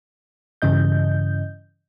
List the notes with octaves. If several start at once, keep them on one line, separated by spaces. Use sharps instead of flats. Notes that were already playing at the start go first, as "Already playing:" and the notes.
G2 C#3 E3 D#5 G6